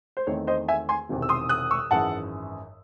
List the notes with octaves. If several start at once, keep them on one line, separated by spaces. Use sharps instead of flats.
C5
E2 D#3 A3 C4 D#4 C#5
C5 D#5
E5 G#5
G#5 C6
E1 E2 C3 D#3
E6
C6 D#6
D#6 F#6
C#6 E6
G#1 F#2 E3 G#3 F#5 A5